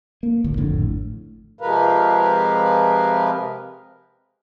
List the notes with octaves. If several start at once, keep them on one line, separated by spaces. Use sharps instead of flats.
A#3
G#1 D2 A2
G#1 F2 A2 D3
C3 F3 G#3 A#4 B4 F5